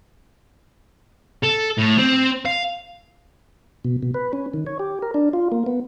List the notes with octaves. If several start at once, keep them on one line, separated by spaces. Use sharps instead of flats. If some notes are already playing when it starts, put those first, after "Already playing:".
A4
A2
C4
F5
B2
B2
B4
C#4
D#3
C#5
G4
A#4
D4
F4
A#3
B3